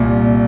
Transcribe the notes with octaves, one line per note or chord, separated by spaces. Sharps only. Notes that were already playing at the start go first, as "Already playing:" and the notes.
Already playing: C2 A#2